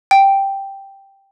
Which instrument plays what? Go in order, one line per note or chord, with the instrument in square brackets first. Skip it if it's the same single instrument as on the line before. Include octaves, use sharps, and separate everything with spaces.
[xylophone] G5